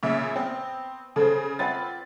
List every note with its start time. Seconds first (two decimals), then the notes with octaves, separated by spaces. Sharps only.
0.03 A#2 C#3 E5
0.34 B3 C4
1.16 C#3 A4 C5
1.59 C4 F4 B4 D5 F#5 A6